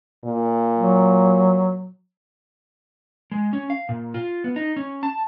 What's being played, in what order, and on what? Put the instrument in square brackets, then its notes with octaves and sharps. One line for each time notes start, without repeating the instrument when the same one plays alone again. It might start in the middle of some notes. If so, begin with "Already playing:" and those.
[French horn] A#2
[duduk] F#3
[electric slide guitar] G#3
C#4
F5
A#2
F4
B3
D#4
C#4
A5